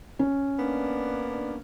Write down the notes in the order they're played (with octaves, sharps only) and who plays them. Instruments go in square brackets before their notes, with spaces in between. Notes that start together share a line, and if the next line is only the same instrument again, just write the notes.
[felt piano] C#4
[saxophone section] A#3 B3 D4